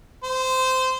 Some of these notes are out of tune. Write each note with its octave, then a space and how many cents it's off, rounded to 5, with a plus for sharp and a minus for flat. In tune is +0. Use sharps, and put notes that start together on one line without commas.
C5 -15